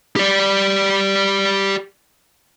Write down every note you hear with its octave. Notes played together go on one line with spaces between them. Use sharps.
G4 D5